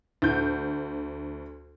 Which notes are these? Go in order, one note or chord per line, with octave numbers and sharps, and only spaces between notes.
D2 G6